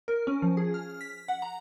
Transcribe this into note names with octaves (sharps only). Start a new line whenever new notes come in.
A#4
C#4
F3
G#4
F6
B6
F#5
A#5